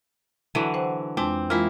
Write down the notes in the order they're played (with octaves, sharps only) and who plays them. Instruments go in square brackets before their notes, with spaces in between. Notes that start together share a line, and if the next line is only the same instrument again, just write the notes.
[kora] D3 E3 F#3
[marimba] C5 F#5 G5
[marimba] F2 G#3 D4 [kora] C4
[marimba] E3 G#3 F4 [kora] A#3 E4